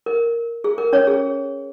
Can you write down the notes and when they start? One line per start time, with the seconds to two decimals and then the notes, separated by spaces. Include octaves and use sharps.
0.06 A#4
0.64 G#4
0.78 A#4
0.93 C#4 C#5
1.07 G#4